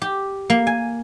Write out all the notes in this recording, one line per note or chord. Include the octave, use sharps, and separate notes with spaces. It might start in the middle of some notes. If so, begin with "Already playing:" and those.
G4
A#3
G#5